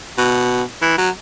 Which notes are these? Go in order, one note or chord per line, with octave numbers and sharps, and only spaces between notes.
B2
E3
F#3